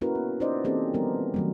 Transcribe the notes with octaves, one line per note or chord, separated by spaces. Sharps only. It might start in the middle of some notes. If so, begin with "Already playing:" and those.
A#3 C#4 E4 F#4 A#4 B4
B3
C#4 D#4 F4 C5 D5 D#5
E3 A#3 C4 C#4 G4 A4
D#3 F3 G3 B3 A#4
D#3 F#3 A3